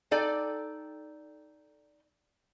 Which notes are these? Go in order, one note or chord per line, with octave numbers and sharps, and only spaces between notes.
D#4 A4 D5 G5